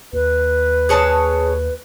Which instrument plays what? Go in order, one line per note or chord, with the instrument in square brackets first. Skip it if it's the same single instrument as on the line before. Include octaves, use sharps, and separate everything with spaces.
[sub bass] D#2 [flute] B4
[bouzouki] G#4 C#5 A5